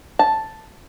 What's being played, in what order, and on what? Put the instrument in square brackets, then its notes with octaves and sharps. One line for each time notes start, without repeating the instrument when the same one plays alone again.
[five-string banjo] A5